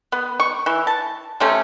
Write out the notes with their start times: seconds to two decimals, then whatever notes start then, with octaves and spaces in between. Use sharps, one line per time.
0.12 B3
0.40 C#6
0.66 E3
0.87 A5
1.40 C3 A3 C#4